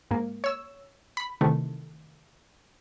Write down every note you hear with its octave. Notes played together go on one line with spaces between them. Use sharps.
G#2 A#3
C#5 E6
B5
C3 D#3 E3 A3